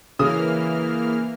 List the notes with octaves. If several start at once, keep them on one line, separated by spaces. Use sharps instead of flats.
C#3 E3 A#3 D#6 F6